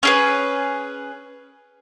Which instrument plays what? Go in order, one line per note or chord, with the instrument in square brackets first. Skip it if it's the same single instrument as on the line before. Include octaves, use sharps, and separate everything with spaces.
[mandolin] C#4 G#4 B4